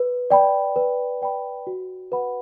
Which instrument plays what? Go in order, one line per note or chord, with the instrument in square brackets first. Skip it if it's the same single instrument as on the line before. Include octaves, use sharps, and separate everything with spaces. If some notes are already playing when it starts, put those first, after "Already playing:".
Already playing: [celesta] B4
D5 G5 B5
B4
D5 G5 B5
F#4
B4 F#5 B5